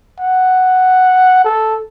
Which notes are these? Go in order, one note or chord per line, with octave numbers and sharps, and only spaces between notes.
F#5
A4